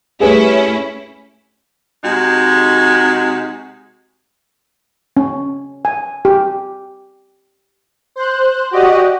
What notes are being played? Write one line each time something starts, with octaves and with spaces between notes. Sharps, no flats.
A3 C#4 E4 G4 G#4 B4
C3 G#3 D#4 F#4
C#4
G#5
G4
C5 F#6
F#4 G4 D5 D#5 F#5